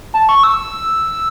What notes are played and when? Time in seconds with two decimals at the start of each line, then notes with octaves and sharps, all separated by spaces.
0.14 A5
0.29 C#6
0.43 E6